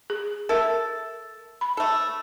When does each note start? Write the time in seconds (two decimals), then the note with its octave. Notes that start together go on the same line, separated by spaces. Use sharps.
0.10 G#4
0.49 A4 A#4 E5
1.61 B5
1.77 A3 A4